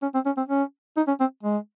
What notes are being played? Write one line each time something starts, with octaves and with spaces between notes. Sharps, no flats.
C#4
C4
C#4
C4
C#4
D#4
C#4
C4
G#3